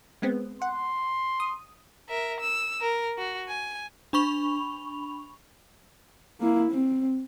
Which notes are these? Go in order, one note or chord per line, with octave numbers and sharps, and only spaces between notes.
G#3 B3 C4
F#5 C6
D#6
A#4 E5
E6
A#4
F#4
G#5
D4 B5 C#6 F7
A#3 E4
C4